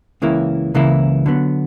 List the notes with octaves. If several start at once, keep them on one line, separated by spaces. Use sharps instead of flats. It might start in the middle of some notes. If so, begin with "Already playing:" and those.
C#2 C#3 E3 A#3 E4
C#2 C#3 E3 A#3 E4
D3 F#3 B3